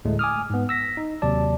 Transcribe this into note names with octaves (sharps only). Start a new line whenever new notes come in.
D2 A2 G#3 A3
G#5 D6 D#6 F6
G#2 B3
E6 A#6 B6
D#4
D#2 C3 F#3 D5 A5